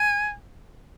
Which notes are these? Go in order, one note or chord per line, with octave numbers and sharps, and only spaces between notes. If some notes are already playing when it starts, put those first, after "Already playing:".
Already playing: G#5